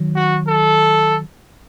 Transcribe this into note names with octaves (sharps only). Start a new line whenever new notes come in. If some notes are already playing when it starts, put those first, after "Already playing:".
Already playing: D#3 F#3
F#4
A4